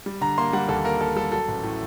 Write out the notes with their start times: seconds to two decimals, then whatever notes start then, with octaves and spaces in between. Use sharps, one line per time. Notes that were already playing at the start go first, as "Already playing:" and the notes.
0.06 G3
0.21 D3 A#5
0.38 A#3 C6
0.53 G3 F#5
0.69 D#2 A4
0.85 A#3 A#4
1.01 A#3 A4
1.16 G3 A4
1.32 F#3 A4
1.48 A1
1.63 A2